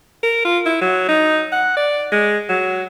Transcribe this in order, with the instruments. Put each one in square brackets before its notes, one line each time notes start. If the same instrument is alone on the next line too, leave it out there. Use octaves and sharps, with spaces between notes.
[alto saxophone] A#4
F4
E4
F#3
D#4
F#5
D5
G#3
F#3